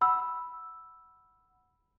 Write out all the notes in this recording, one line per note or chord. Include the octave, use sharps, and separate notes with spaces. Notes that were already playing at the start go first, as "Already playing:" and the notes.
F#5 B5 E6